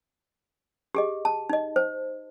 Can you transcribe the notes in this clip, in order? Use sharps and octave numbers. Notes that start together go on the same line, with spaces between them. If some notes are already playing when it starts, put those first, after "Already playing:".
G4 G#4 D#5
A5
D#4 D#5
C5